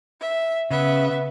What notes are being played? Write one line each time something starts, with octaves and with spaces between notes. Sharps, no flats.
E5
C#3 B3 E5